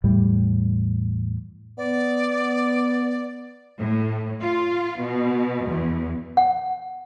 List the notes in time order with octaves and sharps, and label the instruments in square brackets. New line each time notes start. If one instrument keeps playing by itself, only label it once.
[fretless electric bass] E2 A2 G3
[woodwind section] B3 [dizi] D5
[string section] A2
F4
B2
E2
[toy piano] F#5